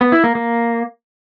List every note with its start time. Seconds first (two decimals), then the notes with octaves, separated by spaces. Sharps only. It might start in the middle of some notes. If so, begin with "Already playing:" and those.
0.01 B3
0.12 E4
0.24 A#3
0.35 A#3